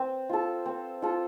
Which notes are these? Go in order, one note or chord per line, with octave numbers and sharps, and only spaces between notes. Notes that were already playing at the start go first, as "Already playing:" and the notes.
Already playing: C4
F4 A4
C4
F4 A4